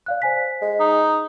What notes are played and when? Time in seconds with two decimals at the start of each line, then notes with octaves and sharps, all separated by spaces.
0.06 D5 F5 F#6
0.22 C5 G#5 B6
0.62 G#3
0.80 D#4